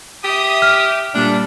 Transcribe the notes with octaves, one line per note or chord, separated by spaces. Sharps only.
G4 E5 D#6
F6
A#2 G3 D4 A4